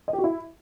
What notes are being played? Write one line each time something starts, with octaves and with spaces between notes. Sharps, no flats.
D#5
G4
F#4
E4